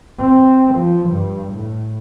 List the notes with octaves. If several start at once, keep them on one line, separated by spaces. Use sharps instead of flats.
C4
F3
G2
A2